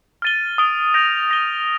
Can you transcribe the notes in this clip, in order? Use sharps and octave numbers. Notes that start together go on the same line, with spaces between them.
F6 A6 D#7 G7
D#6 A6 D7 G7
G6 A#6 D7 F7
G6 A#6 D#7 G7